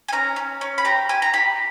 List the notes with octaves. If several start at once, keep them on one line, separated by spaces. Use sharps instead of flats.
G#5
C#4 A#5
C#4
C#4
B5
G4 A#5
G4 G#5
A#5
G4 B5